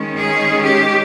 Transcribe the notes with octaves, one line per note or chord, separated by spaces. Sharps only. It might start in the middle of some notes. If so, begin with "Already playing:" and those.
Already playing: D#3 G#3 C#4
G#4
G4